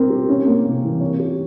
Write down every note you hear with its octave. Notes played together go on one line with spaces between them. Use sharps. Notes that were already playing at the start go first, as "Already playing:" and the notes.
Already playing: C4 A#4
G4
C#4
A#3
C3
E3
C#5
G4